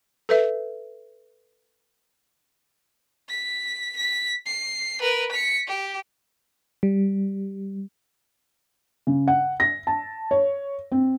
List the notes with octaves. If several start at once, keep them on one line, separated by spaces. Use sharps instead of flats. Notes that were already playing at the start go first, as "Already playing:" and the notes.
A4 B4 E5
B6
B6
C7
A#4 B4
B6 C#7
G4
G3
C#3
F#5
A#6
A5
C#5
C4